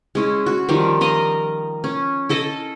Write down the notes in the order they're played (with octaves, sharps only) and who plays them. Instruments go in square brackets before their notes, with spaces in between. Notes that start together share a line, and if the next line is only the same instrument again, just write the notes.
[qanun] G#3 C#4 E4
F#4
D#3 F3 G3
A#4 D#5 F5 A#5
C#4
E4 A4 D#5